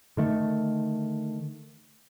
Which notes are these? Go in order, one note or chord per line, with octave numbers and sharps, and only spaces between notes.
D3 D#3 A3